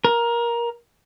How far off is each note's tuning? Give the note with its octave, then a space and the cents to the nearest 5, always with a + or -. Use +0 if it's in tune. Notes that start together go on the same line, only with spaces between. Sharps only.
A#4 +15